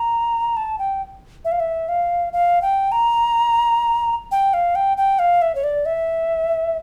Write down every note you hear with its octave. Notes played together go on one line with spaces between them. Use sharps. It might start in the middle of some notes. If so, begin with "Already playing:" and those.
Already playing: A#5
A5
G5
E5
F5
E5
F5
F5
G5
A#5
G5
F5
G5
G5
F5
E5
C#5
D5
E5